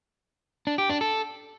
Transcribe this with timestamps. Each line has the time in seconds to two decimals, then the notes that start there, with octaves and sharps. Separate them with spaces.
0.67 D4
0.78 G4
0.90 D4
1.01 A4